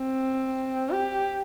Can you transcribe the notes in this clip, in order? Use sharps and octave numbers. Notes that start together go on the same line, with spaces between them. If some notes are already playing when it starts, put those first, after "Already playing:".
Already playing: C4
G4